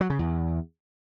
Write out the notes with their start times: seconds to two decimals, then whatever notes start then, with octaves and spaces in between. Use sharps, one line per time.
0.01 F#3
0.10 C#3
0.19 E2